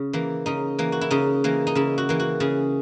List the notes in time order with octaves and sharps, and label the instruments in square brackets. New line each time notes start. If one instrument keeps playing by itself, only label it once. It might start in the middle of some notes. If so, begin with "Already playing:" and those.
Already playing: [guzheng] C#3
E3 A#3
C#3 D#4
E3 A#3
F#4
E4
C#3 D#4
E3 A#3
D#4
C#3 E4
F#4
E3 A#3
F#4
C#3 G#4